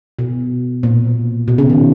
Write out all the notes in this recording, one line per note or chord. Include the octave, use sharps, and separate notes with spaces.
B2
A#2
B2
C#3
D#3